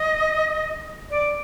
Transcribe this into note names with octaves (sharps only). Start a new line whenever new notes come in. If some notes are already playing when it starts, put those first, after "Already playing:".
Already playing: D#5
D5